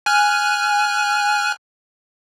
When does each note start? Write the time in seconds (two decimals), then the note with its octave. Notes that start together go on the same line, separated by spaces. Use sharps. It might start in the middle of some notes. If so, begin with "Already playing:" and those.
0.06 G#5 F6 F#6